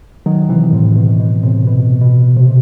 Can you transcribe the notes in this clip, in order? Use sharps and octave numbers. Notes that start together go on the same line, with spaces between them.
D#3 F#3
C3 E3
A2 C3
B2
B2
A2 C3
B2
B2
A2 C3